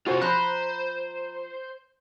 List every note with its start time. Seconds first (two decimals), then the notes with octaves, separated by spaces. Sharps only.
0.06 C3 F4 F#4 G#4 C5
0.21 F3 C5 A#5 B5 F#6